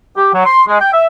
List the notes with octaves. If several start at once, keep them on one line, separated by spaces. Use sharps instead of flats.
G4
F#3
C6
G#3
G5
E5